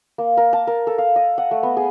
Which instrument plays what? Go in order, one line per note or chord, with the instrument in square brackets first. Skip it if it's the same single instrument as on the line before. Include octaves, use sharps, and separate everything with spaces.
[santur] A#3
A#4
A5
A#4
A4
F5
D#5
F#5
A3
B3
G#4